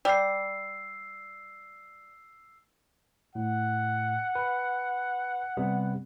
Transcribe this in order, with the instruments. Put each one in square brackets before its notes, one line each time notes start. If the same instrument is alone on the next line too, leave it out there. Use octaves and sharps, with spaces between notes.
[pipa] G3 [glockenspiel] E6 C7
[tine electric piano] A2 [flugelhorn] F#5
[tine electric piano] B4
C3 G3 B3